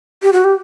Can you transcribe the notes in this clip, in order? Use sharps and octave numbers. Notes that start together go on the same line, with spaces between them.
G4
F#4
G4